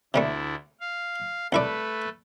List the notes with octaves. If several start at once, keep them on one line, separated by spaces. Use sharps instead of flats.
D2 C3 G3 A3 D4 E4
F5
C2 A3 E4 A4 B4 D5